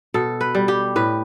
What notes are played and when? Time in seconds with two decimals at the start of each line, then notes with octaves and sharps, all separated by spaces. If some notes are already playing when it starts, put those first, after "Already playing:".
0.14 B2 A4
0.41 B4
0.55 G3
0.68 G4
0.96 A2 B4